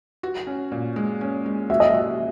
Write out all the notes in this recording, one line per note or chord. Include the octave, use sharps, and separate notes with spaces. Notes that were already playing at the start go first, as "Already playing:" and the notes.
F#4
C#4
A#2
G#3
C#4
G#3
F#4 E5
D#5
F#4 E5